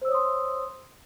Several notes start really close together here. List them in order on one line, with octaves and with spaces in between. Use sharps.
C5 E6 C#5 D#6 C6